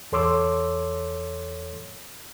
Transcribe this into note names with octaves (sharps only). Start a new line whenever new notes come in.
E2 A4 C#5 C6 D6 E6